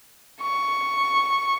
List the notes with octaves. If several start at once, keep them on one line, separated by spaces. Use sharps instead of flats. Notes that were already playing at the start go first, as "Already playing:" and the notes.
C#6